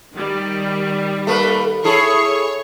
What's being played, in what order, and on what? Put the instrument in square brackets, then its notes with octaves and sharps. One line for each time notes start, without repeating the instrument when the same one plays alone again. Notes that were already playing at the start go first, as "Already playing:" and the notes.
[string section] D#3 G3
[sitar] A3 A#3 B4
[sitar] E4 G#4 A4 [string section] C#5 C#6